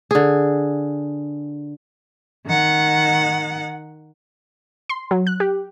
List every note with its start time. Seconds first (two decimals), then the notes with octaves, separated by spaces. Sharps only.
0.11 D3 G#4
2.46 D#3 F#5
4.89 C6
5.11 F#3
5.27 F#6
5.40 G4